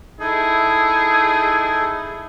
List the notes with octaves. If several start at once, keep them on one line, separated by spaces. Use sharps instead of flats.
D#4 E4 G#4 A4